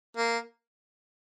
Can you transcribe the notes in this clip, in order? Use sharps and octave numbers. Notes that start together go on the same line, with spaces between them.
A#3